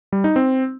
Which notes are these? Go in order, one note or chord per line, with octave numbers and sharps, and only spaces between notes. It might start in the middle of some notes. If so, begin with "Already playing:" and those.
G3
D#4
C4